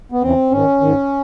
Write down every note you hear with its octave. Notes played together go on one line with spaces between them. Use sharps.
B3
E2 C#3 E3 C4
G#2 D#3 C#4
G#2 D#3